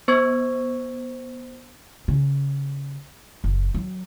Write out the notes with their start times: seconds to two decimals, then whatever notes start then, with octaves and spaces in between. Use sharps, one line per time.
0.08 B3 C5 C#6 E6 G#6
2.08 C#3
3.44 F#1
3.74 F#3